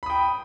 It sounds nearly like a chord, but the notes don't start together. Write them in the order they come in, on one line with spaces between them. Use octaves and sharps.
B5 D#6 G5